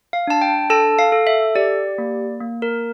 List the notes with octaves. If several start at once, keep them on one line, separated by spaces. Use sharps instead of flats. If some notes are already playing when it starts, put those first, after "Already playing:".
F5
D4 A5
G5
A4 A5
F5
A4
E5
G4 D5
A#3
A#3
A#4